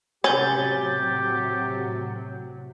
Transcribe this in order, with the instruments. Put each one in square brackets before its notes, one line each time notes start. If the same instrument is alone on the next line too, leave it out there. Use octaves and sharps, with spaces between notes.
[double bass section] A2 C3 F#3 [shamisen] C#4 [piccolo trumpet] G4 [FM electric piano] G6 A6